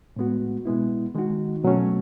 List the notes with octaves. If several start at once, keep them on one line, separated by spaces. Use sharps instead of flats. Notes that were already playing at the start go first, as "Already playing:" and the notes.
A2 G#3 B3 F#4
B2 G#3 B3 E4
D#3 G#3 D#4 F#4
B2 F#3 A3 C#4